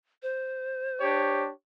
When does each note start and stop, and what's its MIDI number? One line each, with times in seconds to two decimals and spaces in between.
0.23 1.43 72
1.01 1.50 62
1.01 1.50 67
1.01 1.50 73